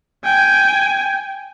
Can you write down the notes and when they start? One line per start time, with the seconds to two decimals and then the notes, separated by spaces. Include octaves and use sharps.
0.25 G5 G#5